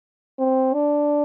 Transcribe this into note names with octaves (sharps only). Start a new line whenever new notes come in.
C4
D4